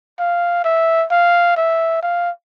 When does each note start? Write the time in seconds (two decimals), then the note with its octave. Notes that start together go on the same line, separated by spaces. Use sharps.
0.19 F5
0.64 E5
1.11 F5
1.57 E5
2.02 F5